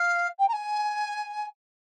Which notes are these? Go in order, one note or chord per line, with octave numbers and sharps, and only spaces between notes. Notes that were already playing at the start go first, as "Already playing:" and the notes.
Already playing: F5
G5
A#5
G#5